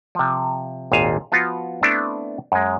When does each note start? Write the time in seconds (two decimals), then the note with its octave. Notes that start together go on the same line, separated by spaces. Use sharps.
0.15 C3 F3
0.92 G#1 D#2 A#2 F5 G#5 A5
1.32 F3 B3 F4 F#4
1.83 A3 B3 C4 D4 E4
2.52 F#2 G#3